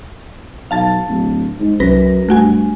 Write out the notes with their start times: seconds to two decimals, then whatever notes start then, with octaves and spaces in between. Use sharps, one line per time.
0.71 B1 F5 A5 A6
1.08 D1
1.60 G#2
1.80 C2 F#2 B4 A#6
2.29 G2 A3 F#4 G#5